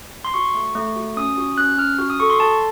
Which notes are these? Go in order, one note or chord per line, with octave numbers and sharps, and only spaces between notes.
C6
F#4 C#6
A3
A3
F#4
C#4 D#6
F#4
C#4 F#6
C#4 F6
F#4
D#6
A4 C#6
C6
A4 A5